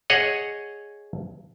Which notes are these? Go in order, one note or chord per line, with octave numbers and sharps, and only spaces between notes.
G#4 C#5 D#5 F#5